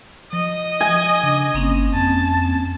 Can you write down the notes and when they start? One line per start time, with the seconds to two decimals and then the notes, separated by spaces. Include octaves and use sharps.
0.33 F3 D#5
0.80 G#5
1.23 C#3 D4
1.54 G1 A#3 C4 C#4
1.94 F2 A5